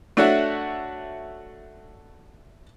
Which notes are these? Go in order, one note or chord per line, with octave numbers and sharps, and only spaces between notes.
A3 D4 F#4 C#5 E5 F#5